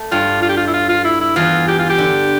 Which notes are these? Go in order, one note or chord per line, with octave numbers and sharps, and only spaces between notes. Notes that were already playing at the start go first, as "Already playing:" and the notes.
Already playing: A3
G2 G3 F4
F4
G4
F4
E4
F4
F4
E4
E4
E2 E3 F4
G4
F4
G4
D3